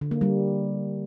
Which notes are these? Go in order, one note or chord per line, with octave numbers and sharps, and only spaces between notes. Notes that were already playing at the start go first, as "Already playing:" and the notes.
D3
A#3
G3